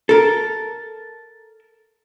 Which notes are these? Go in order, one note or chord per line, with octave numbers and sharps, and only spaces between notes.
A4 A#4